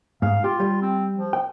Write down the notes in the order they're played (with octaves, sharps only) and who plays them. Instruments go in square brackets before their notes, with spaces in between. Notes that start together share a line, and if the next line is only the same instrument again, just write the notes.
[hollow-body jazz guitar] G#2 [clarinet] F5
[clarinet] F4 [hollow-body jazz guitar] G4
[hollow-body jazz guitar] G3
[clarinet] C4
F3
[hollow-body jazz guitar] G5